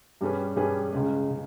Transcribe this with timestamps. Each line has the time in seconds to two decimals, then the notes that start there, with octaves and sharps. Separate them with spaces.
0.21 G2 G3 C#4 G#4 B4
0.56 G2 G3 C#4 G#4 B4
0.92 C#2 C#3 G#3
1.30 C#3